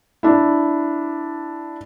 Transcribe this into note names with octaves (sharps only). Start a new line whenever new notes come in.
D4 E4